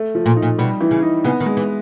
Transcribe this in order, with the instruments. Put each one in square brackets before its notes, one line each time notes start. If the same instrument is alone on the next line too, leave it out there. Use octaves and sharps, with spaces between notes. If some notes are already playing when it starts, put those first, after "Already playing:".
Already playing: [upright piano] A3
F3
[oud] A#2
[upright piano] D#4
[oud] A#2
[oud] B2 [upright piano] G3
[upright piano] E3
[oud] C#3
[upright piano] D#4
[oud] C#3 [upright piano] B3
[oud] D#3
[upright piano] G#3
[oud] E3